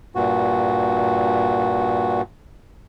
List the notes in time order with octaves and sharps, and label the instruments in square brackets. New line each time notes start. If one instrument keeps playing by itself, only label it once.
[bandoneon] G2 A#2 F#4